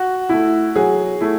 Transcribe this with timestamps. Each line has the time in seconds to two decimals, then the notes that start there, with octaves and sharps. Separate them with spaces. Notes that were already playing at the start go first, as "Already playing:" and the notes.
Already playing: F#4
0.29 A3 E4
0.75 F#3 G#4
1.21 A3 E4